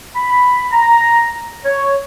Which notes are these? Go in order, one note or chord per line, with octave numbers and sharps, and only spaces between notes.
B5
A#5
C#5